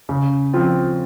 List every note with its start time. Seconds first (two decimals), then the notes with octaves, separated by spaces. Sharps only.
0.09 C#3
0.53 F3 C4 F4